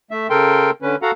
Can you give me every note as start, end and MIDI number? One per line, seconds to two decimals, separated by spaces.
0.11 0.27 57
0.11 0.27 76
0.30 0.70 49
0.30 0.70 69
0.30 0.70 70
0.30 0.70 79
0.30 0.70 84
0.82 0.96 50
0.82 0.96 61
0.82 0.96 71
1.02 1.11 66
1.02 1.11 69
1.02 1.11 77
1.02 1.11 78
1.02 1.11 82